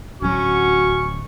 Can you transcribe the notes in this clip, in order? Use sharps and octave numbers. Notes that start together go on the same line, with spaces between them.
D1 F#3 C#4 F#4 C#6